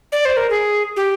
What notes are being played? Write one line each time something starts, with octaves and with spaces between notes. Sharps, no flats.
D5
C5
A#4
G#4
G4